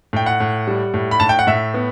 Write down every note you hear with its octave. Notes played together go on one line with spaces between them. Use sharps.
A2 G5
F#5
A2
G3
A2
B5
A2 A5
G5
F#5
A2 E5
B3